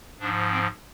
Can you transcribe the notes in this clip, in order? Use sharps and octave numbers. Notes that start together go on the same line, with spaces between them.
G#2 F3 D4
C4